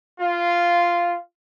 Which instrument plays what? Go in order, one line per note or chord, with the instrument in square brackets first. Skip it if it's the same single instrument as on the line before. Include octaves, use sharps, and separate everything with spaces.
[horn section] F4